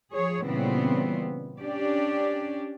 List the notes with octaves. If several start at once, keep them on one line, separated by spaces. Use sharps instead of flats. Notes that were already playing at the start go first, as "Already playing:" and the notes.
F3 G#4 C#5
A#2 C#3 E3 G3 B3 C4
C#4 D4 G4 D5